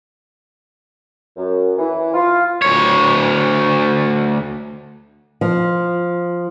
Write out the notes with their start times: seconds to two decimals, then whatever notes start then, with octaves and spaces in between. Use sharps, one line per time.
1.37 F#2
1.77 E3
2.13 F4
2.62 D2 C#5
5.41 F3